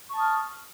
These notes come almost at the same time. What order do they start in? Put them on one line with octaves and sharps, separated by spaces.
C#6 A5 D#6 F6